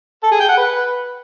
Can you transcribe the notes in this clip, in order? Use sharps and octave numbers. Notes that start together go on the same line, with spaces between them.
A4
G#4
G5
F#5
B4